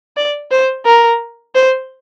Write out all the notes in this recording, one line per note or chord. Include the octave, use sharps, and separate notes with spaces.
D5
C5
A#4
C5